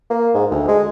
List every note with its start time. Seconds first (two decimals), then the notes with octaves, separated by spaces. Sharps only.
0.10 A#3
0.34 G#2
0.51 D2
0.68 G#3